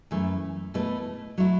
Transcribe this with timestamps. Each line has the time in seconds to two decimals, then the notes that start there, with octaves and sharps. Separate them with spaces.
0.11 F#2 E3 A3
0.74 B2 A3 E4 B4
1.38 F#3 A3 E4